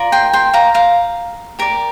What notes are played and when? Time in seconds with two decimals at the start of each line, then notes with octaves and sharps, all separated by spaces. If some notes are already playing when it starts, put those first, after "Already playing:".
Already playing: F4 A#4 D5
0.12 G5 C6
0.33 G5 C6
0.54 F5 A#5
0.74 F5 A#5
1.59 G4 A#4 D5